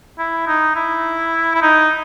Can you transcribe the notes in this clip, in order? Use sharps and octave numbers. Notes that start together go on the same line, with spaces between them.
E4
D#4
E4
E4
D#4